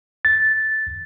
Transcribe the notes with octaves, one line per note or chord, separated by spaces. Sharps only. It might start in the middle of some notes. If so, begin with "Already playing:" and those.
A6